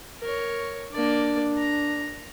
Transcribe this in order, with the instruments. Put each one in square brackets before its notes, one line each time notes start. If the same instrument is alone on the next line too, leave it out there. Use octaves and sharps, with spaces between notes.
[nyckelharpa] A#4 C#5
[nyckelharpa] A#3 D5 [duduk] D4
[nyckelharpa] A#5